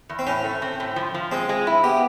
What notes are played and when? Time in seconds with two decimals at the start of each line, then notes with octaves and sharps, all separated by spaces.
0.09 E2
0.19 C4
0.27 A2 C#4
0.44 A3
0.62 C4
0.80 A2
0.96 F3
1.14 F3
1.32 G#3 C4
1.49 G#3
1.67 E4
1.83 B3 G4